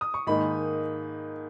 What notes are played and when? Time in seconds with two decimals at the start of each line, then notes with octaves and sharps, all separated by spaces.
0.01 D#6
0.14 C#6
0.27 G#2 D#3 A#3 D#4 B5